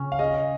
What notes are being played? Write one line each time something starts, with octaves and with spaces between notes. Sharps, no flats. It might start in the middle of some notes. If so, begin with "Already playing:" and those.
Already playing: C#3 C#4
F5
G#4 D#5